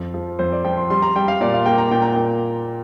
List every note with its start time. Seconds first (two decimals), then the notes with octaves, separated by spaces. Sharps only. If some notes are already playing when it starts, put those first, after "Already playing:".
Already playing: F2
0.14 F3
0.39 F2 C5
0.52 D5
0.65 F3 G5
0.77 C6
0.90 G3 C6
1.02 A#5
1.16 G3 G5
1.28 F5
1.41 A#2 D5
1.54 F5
1.66 A#3 G5
1.78 A#5
1.91 A#2 G5
2.02 A#5
2.13 A#2 G5